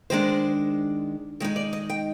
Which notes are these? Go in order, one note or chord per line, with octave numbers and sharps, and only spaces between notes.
D#3 G#3 D4 C5
D#3 G#3 D#4 D5
D5
D#5
G5